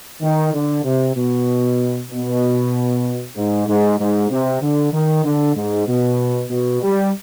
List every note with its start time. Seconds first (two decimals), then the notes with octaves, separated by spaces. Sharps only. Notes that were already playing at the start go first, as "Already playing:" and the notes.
0.22 D#3
0.53 D3
0.84 C3
1.16 B2
2.11 B2
3.36 G#2
3.67 G#2
3.99 G#2
4.30 C3
4.62 D3
4.92 D#3
5.25 D3
5.55 G#2
5.87 B2
6.50 B2
6.82 G3